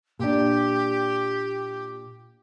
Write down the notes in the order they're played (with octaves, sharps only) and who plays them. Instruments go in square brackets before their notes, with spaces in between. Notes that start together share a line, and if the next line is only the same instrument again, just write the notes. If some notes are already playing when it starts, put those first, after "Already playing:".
[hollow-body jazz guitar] A#2 D4 [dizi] G4